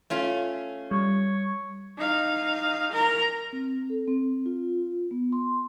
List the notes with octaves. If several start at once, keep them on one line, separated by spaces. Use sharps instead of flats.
A3 C#4 F4
G3 C#5
D#4 F5
A#4 A#5
C4
A4
C4
F4
B3
C6